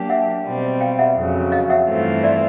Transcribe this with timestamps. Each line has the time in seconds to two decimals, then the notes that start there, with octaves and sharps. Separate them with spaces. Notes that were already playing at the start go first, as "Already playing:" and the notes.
Already playing: F#3 A#3 D4 G4
0.09 E5 F#5
0.45 B2 G3 C4
0.81 F5 G5
0.99 E5 F#5
1.16 F2 C#3 F#3
1.52 D#5 F5
1.70 E5 F#5
1.88 G2 E3 A3 C4 F4
2.24 D5 E5